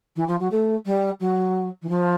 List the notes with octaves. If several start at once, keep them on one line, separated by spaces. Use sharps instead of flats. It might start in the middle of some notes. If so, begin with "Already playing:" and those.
E3
F3
F#3
A3
G3
F#3
E3
F3